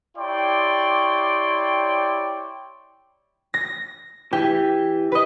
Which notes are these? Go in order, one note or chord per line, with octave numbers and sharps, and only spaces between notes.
E4 G4 C#5 D5 G5 C6
A#6
E3 G4
B4 D#5